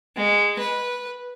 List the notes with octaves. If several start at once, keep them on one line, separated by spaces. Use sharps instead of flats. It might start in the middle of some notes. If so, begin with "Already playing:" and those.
G#3
B4